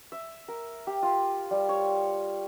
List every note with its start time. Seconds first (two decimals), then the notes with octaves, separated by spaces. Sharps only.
0.12 E5
0.48 A#4
0.87 G4
1.03 F4
1.51 G3
1.69 C#5